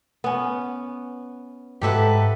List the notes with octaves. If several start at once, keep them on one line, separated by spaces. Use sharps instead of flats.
B3 C#4
G#2 G4 A4 B4 E5 F#5